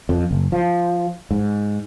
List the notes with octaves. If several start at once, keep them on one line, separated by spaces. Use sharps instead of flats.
F2
F#1
F3
G#2